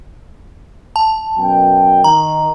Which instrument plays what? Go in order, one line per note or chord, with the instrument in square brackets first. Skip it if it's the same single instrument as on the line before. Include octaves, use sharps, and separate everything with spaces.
[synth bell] A5
[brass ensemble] F#2 B2 G5
[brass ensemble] D#3 [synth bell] A#5